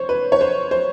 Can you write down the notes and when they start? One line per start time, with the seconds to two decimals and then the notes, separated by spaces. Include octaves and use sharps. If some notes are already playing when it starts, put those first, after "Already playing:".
Already playing: C5 C#5
0.09 B4
0.32 C#5
0.41 C5
0.71 C5